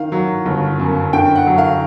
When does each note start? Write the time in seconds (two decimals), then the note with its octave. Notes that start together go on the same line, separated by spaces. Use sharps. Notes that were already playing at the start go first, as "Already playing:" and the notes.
Already playing: D#3 F5
0.12 F#3
0.46 G1
0.79 F#2
1.13 D3 G5
1.36 F#5
1.47 F#3
1.58 F5